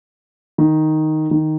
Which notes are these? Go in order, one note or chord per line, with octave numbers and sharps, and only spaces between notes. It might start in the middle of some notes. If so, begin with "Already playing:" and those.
D#3
D#3